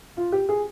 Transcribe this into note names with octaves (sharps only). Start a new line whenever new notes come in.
F4
G4
G#4